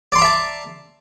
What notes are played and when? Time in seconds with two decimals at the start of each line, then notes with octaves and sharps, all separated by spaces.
0.12 D5
0.15 C6
0.18 A#5
0.22 E5
0.25 A5